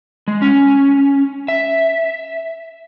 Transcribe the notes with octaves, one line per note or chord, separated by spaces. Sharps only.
G#3
C#4
E5